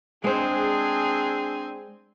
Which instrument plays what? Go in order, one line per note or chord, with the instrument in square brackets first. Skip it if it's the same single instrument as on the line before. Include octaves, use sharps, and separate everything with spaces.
[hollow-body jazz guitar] G#3 C5 [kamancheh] C4 G#5 [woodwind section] D4 G#4